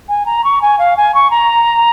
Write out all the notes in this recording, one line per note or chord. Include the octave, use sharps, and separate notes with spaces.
G#5
A#5
C#6
G#5
F5
G#5
C#6
A#5